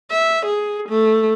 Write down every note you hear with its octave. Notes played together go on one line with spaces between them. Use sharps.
E5
G#4
A3